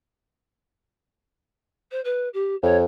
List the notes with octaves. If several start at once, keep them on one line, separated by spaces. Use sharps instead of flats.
C5
B4
G4
F2 C#5